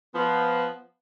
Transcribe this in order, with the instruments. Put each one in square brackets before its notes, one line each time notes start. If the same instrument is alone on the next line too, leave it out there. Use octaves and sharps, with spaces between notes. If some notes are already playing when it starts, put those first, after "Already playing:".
[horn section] F3 B3